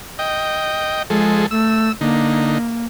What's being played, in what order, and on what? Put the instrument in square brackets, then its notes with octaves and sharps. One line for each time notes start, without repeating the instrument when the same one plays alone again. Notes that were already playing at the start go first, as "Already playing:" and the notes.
[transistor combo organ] D#5 G5
[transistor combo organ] F3 G#4 A4 [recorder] G#3
[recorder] A3 [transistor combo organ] E6
[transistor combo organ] D3 D#4 [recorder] A#3